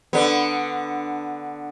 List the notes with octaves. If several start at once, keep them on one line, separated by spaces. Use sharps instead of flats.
D3 B3